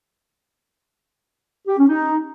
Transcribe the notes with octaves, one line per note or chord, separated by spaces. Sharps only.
G4
C#4
D#4